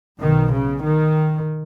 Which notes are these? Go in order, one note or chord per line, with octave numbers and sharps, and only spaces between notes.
B1 B2 D#3
C#3
D#3